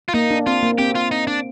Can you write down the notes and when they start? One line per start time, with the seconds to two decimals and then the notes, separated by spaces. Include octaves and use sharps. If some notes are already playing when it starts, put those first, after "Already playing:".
0.09 F4
0.14 A#3 D#4
0.31 D4
0.47 C4 F4
0.63 A#3
0.78 C4 G4
0.95 F4
1.11 D#4
1.27 D4